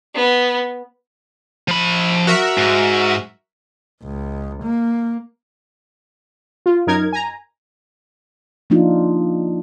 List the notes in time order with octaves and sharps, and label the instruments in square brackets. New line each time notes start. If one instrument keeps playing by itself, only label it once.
[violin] B3
[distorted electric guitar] F3 B5
[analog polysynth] F#4 A#4 E5
[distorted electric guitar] G#2
[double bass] C#2
A#3
[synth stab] F4
F#2 D#4 A#4 G#6
G#5 A#5
[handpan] F3 A#3 D4 D#4 F4